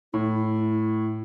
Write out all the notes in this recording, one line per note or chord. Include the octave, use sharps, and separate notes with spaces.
A2 E4